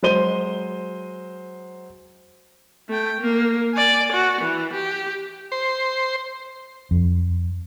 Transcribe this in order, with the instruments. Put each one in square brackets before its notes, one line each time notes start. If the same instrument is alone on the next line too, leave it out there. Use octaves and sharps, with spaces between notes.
[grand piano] F#3 G#3 C5 D#7 G7
[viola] A3 G5
A#3
D5 G#5
F#4
E3
G4
[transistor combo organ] C5
[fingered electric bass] F2